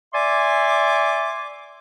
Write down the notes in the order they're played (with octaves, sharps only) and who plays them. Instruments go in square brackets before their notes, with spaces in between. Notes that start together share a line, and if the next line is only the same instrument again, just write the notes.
[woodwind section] D5 E5 G#5 C6 D6